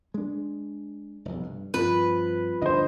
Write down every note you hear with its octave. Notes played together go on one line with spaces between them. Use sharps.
G#3 D4
F1 B1
G2
G2 F3 C4 B4
G1 D2 D4 C5 D#5